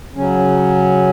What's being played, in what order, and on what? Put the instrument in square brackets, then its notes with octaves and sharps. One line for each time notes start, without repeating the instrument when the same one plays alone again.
[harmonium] C#3 F#3 C#4